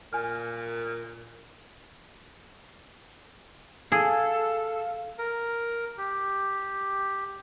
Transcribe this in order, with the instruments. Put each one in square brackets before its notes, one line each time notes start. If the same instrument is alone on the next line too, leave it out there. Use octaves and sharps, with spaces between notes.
[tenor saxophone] A#2 [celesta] G#5 F6
[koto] G#4 [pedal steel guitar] A4 [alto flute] F5
[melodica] A#4
G4